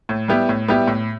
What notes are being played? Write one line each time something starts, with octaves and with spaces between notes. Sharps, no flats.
A2
G3 B3 E4 G4
A2
G3 B3 E4 G4
A2